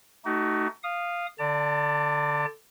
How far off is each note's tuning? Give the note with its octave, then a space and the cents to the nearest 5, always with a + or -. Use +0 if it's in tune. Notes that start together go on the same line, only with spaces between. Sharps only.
A3 +0 D#4 +0 F#4 +35
F5 +0 D#6 -20
D3 +0 D5 +0 A5 +35